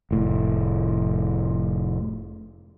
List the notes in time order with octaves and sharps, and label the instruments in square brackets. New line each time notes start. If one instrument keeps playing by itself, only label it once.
[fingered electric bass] F1 A2